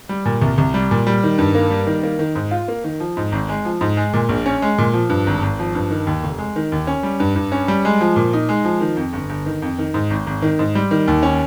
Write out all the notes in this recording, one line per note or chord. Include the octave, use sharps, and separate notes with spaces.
G3
A#2
C2
C2
G3
A#2
G3
D#3
G2
A#3
G3
D#3
A#3
D#3
G#2
F4
A#3
D#3
F3
G#2
G#1
G#3
F3
G#2
G#3
A#2
A#1
C#4
G#3
A#2
F3
G2
G#1
G#1
F3
G2
D#3
D#2
F1
G#3
D#3
D#2
C#4
G3
G2
G2
C#4
G3
G#3
F3
A#2
D#4
G#3
F3
D#3
F2
G1
G1
D#3
F2
D#3
G#2
G#1
G#1
D#3
G#2
G3
D#3
D#2
C#4